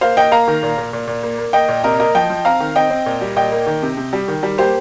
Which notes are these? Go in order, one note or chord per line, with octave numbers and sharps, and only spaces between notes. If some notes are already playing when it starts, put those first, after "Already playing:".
A#3 C5 F5
A#3 D#5 G5
A#3 F5 A#5
D#3
A#2
A#2
A#2
A#2
A#3
A#3
A#3 D#5 G5
A#2
C3 A#4 D#5
A#3 A#4 D#5
F3 D#5 G5
F3
C4 F5 A#5
D#3
C4 D#5 G5
C4
A#2
G3
A#2 D#5 G5
A#3
D#3
C3
C3
G3
D#3
G3
A#3 G4 C5